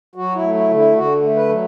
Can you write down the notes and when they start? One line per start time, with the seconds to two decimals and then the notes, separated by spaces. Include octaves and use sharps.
0.15 F#3 F#4
0.35 E4
0.42 A3
0.55 E4
0.69 D3
0.75 E4
0.95 D3 F#4
1.22 A3
1.36 B4
1.49 F#3